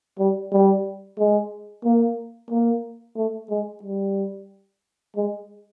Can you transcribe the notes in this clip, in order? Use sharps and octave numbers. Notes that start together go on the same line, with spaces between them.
G3
G3
G#3
A#3
A#3
A3
G#3
G3
G#3